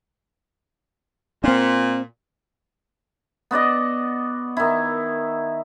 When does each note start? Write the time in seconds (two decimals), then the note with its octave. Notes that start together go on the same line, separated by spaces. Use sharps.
1.44 A#2 C4 D4
3.51 B3 F#4 D5 D#5
4.57 D#3 E4